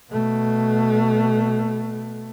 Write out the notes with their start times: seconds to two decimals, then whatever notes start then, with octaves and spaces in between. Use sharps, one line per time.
0.11 B2 A3